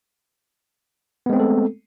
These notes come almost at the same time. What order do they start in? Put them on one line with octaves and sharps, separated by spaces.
B3 G#3 C4 A3 A4